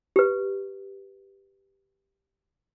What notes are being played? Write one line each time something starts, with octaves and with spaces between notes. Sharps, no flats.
G4 B4